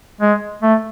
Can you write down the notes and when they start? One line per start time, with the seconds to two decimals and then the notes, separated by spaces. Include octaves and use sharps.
0.21 G#3
0.62 A3